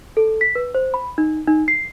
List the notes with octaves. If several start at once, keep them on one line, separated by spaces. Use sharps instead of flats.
A4
B6
B4
C5
B5
D#4
D#4
C7